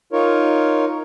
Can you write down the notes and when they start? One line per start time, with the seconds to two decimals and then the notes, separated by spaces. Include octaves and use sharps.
0.13 D#4 F4 A#4 C#5